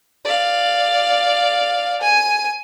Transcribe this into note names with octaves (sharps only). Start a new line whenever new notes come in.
D5 F5
G#5